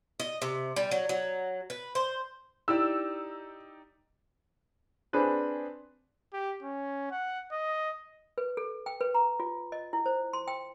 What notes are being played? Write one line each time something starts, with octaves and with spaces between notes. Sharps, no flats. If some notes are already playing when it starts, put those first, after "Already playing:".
D#5
C3
G3
F#3
F#3
B4
C5
D#4 E4 G4 D5 E6
C4 D4 G#4 B4 C5
G4
C#4
F#5
D#5
B4
A4
G5
B4
A#5
F4
D#5
E4
C5
C6
G5